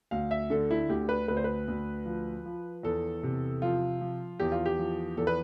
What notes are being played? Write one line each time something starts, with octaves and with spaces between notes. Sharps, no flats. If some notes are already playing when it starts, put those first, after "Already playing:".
D2 F5
E5
D3 A4
E4
D2 G4
B4
D2 B4
C5
B4
D2
F3
F3
E2 A4
C3
F3 F4
F3
E2 G4
F4
G4
F3
E2 A4
B4